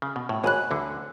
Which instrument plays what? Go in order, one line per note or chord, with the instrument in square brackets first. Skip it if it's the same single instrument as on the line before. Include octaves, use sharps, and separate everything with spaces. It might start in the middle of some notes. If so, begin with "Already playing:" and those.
[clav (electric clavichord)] C#3
B2
A2
[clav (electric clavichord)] G#1 G#2 [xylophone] C#5 G#5 B5 F#6
[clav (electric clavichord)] D2 D3